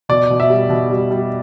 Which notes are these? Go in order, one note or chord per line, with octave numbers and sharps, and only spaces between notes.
B2 D5
B2
E5
G3
B2
G3
G3